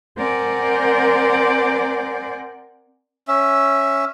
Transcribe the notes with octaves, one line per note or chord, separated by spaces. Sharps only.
C4 A#4 C5 D5 F#5 G#5
C#4 E5